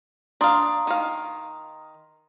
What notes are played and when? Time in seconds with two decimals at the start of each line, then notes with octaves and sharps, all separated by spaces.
0.41 D4 F5 A#5 C6 D#6
0.87 D#3 F5